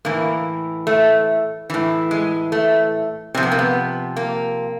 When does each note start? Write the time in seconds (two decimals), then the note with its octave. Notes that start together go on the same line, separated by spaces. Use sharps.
0.05 A2 E3 A#3
0.87 A3
1.70 A2 E3
2.11 G#3
2.52 A3
3.34 C3 C4
3.37 F3
3.43 B3
3.52 A#3
3.59 B3
4.16 A#3